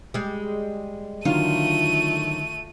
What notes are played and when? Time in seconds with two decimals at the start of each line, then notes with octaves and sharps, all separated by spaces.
0.14 G3 G#3
1.25 D3 D#3 F#3 A3 F4 D#7